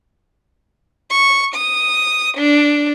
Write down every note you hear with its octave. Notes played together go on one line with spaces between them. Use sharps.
C#6
D#6
D4